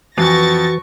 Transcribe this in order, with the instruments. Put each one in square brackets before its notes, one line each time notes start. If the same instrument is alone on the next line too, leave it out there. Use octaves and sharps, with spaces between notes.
[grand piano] F2 [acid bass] E3 [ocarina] F#4 [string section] C#6 A6 A#6